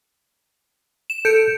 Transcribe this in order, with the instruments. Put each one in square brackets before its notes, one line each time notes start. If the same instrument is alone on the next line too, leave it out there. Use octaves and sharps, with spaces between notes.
[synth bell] E7
[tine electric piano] A4 [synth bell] G6 C#7 D7